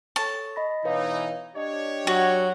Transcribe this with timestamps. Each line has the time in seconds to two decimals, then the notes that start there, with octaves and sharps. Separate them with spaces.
0.16 A4 C#5 A5 C#6
0.56 D#5 B5 A#6
0.85 B2 E3 D#4 B4 C#5 F5
1.56 D4 G4 C#5 D#5
2.07 F#3 F#4